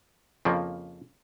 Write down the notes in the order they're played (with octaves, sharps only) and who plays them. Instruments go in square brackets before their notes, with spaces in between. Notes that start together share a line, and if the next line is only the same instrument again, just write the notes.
[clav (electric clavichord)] F2 C#3 F3 A#3